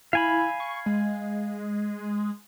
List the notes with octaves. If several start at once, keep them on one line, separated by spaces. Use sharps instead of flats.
E4 F5 G#5 B5
C#6
G#3